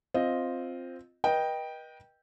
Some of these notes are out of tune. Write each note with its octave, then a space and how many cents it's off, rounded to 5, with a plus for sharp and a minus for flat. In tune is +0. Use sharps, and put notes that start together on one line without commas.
C4 +0 F4 +0 D#5 +0
B4 -40 D#5 +0 G5 +0